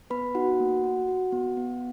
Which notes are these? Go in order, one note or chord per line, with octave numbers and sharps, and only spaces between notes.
B3 B4 B5
D#4 F#4 F#5
A#3
F#4
F#4
B3
B3